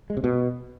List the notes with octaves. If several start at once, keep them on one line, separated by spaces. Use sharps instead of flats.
G#3
C3
B2